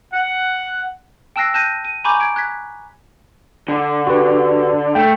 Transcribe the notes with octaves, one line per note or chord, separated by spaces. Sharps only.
F#5
G5 A5 E6 F#6 A#6 C7
A5 F#6 G6 A#6 D#7
D#7
G#5 A#5 B5 C#6 D6 G6
G#6 D7
F#6 G#6 B6
D3
F#4 G4 B4
A3 G5